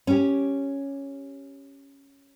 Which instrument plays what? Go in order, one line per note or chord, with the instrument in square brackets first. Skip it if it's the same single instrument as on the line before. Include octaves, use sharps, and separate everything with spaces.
[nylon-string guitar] C#4 G4